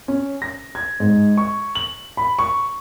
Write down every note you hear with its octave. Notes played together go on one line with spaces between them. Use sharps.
C#4
A#6
G#6
G#2
C#6
F#7
B5
C#6